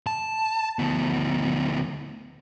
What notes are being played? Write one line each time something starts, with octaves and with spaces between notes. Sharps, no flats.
A5
D2 B3